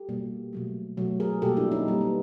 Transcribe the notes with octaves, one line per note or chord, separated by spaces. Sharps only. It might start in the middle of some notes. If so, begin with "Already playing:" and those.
Already playing: G4 A4
B2 G3 A#3
B2 F#3 A3
B2 F#3 A3
G#4 A#4
B2 G3 A#3 G4 A4
D4 E4
C#4 D#4
B2 G3 A#3
B3